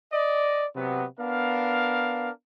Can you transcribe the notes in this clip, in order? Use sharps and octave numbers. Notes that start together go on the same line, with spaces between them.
D5 D#5
C3 F#3 B3
B3 D4 A#4 F5